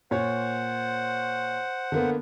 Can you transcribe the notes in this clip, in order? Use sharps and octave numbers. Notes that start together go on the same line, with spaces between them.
A#2 C5 C#5 F#5
D3 A#3 B3